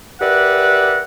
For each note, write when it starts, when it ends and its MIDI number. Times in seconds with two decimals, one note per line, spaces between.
0.21 1.04 67
0.21 1.04 70
0.21 1.04 71
0.21 1.04 74
0.21 1.04 76
0.21 1.04 78